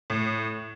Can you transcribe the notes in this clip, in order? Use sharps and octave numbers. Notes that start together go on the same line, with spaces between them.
A2